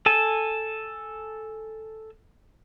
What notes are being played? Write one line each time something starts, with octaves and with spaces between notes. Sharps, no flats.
A4 G#5 A5